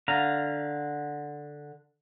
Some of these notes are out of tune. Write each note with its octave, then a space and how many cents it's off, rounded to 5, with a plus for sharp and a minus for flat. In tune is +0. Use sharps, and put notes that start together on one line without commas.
D3 +0 F5 +0 A#5 +0